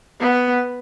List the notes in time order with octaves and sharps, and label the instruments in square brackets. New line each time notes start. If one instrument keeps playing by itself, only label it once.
[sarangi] B3